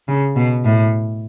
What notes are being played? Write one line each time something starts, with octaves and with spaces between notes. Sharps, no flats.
C#3
B2
A2